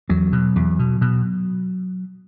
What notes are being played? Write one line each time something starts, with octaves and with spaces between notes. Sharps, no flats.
E2 F#3
B2
E2
B2
B2